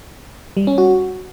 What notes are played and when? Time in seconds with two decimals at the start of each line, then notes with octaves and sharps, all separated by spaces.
0.57 G3
0.67 C#4
0.78 F#4